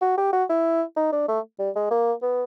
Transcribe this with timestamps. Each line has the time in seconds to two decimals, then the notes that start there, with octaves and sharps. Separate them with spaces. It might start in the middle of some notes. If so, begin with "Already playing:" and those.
0.02 F#4
0.18 G4
0.33 F#4
0.49 E4
0.96 D#4
1.13 D4
1.28 A3
1.59 G3
1.75 G#3
1.91 A#3
2.22 B3